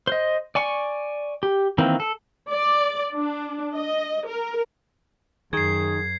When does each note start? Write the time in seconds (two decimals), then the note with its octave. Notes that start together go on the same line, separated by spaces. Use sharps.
0.07 C5 D#5
0.55 D5 G#5 C#6
1.43 G4
1.78 D#3 E3 A#3 C4
2.00 A4
2.50 D5
3.14 D4
3.74 D#5
4.27 A#4
5.53 F#2 D#3 G#4 G#6 C7